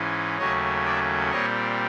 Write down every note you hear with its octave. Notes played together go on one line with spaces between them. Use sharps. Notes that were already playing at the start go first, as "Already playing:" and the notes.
Already playing: G#2 E3 G#3 C#4
D#2 C#3 F#3 A3 C#4 C#5 D#5
D5 E5
A#2 G3 C4 C#5 D#5